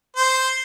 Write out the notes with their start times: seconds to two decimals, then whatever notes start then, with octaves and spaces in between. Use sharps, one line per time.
0.17 C5